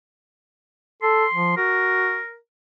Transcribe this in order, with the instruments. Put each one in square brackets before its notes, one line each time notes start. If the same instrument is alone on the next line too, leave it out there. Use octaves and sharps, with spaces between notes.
[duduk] A4 [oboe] C6
[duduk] F3
[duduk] F#4 [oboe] A#4